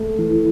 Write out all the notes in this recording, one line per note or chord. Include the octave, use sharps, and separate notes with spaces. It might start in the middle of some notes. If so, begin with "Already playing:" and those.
Already playing: A3
E3